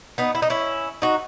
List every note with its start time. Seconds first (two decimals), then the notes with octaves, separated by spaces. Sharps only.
0.18 B3 D#4
0.35 E4
0.42 D#4
0.50 C#4 E4
1.02 D#4 F#4